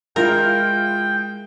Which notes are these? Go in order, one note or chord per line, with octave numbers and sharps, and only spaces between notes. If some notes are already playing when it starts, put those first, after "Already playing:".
G#3 E4 F4 A#4 G5